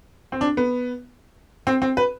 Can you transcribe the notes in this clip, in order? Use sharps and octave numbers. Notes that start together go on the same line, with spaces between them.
C4
D4
B3
C4
C4
B4